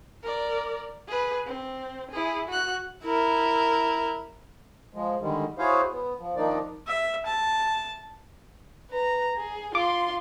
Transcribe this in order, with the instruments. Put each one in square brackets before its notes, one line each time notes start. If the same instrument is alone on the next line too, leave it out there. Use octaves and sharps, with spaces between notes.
[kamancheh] A#4 D5
G#4 B4
C4
E4 G#4
F#4 F#6
E4 A#4
[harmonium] F3 G#3
D3 D#3 G3 G#3
E4 F#4 G#4 C5 C#5 F5
B3
F3
D#3 F3 A#3 D4 D#4 D5
[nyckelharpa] E5
A5
[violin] B4 A#5
G#4
[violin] F4 C6 [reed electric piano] D6